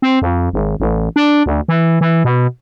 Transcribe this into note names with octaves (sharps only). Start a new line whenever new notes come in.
C4
F2
G#1
A1
D4
D2
E3
E3
B2